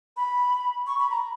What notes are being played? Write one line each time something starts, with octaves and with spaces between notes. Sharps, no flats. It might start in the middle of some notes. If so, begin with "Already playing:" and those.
B5
C#6
B5
A#5